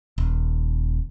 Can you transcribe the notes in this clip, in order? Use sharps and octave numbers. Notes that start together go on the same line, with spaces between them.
D#1